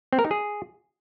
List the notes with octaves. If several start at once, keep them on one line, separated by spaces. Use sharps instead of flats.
C4
A#4
D#4
G#4